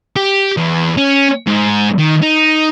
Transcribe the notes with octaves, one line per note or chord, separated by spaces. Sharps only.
G4
E2
C#4
G#2
D#3
D#4